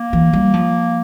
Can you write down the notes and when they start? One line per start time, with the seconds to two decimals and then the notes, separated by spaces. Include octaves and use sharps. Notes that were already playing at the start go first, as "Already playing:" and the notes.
Already playing: A#3
0.13 E3
0.33 G3
0.54 F3